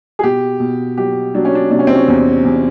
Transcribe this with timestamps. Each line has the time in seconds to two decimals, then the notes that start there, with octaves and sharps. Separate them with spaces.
0.19 G#4
0.23 B2 G4
0.60 B2
0.98 F#3 G4
1.35 F#3 D4
1.45 C#4
1.55 D4
1.71 C3 D4
1.79 C#4
1.87 C4
1.95 C#4
2.08 E2
2.45 E2